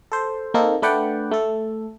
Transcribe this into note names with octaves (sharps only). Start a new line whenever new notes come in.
A4 C5
A#3 C4 D#4 A4 A#4
A3 D4 B4 D5 F#5 G5
A3 A4